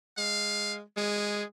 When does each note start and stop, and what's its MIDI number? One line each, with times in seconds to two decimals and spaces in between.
0.18 0.81 56
0.18 0.75 77
0.97 1.44 56
0.97 1.44 68